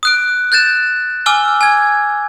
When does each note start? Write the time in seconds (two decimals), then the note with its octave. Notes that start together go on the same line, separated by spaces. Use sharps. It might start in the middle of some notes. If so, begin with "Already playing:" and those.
0.03 D#6 F#6 D7
0.52 F#6 G6 A6 E7
1.26 G#5 D6 E6 F6 G7
1.61 G#5 G#6